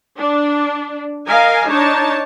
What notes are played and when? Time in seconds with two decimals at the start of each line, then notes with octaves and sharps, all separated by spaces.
0.19 D4
1.28 A#4 D#5 F5 G#5
1.67 D4 D#4 C#5 A5